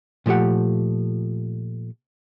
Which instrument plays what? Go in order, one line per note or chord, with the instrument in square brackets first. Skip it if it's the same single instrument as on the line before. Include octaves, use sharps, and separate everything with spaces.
[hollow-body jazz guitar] A#2 F3 A3 G4 F#5